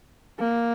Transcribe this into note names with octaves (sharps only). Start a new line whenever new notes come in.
A#3